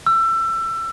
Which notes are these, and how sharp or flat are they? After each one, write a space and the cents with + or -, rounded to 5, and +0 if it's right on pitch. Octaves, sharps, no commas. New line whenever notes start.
E6 +25